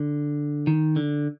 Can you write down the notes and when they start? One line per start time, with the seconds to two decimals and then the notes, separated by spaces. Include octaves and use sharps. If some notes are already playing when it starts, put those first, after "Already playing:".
Already playing: D3
0.67 D#3
0.96 D3